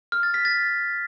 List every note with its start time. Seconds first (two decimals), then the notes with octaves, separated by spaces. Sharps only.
0.12 F6
0.23 A6
0.34 B6
0.45 A6